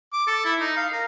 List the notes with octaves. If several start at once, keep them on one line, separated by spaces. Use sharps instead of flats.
D6
A4
E4
D#4
F5
A#4